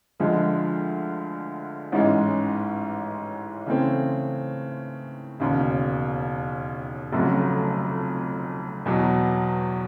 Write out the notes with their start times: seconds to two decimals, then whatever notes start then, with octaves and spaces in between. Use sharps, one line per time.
0.20 D2 D3 F3 G#3
1.92 A1 G#2 E3 G#3 C#4
3.66 C#3 E3 A3 C4
5.40 E1 D#2 C#3
7.12 F1 F2 C#3 F#3 A3
8.86 E2 B2 F#3